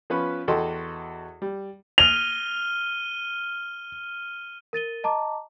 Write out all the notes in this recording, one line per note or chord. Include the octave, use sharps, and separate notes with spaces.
F3 B3 C#4 B4 B5
E2 F#4 A4 D#5 G5 C6
G3
F6 D#7 F7 G7
A#4 A6 D#7 G7
D#5 A5 A#5 D6